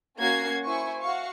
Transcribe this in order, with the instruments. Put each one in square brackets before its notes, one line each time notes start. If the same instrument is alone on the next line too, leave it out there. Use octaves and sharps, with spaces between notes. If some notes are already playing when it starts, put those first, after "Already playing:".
[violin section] A#3 C#4 F#4 G#6 C7
E4 C5 G#5 C#6
F#4 F5 C#6